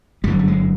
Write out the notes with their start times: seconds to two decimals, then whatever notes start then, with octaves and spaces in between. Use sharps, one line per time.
0.24 G1 F#2 D3 G3
0.39 G3
0.48 G#3